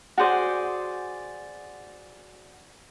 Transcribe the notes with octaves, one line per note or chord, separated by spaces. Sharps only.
F#4 G#4 C5 D5